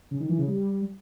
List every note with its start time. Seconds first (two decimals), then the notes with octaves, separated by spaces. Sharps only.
0.11 C#3
0.20 D#3
0.29 E3
0.38 C#3
0.47 G3